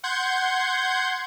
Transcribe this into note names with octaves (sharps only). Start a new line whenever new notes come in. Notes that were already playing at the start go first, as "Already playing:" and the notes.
F#5 C6 G6 G#6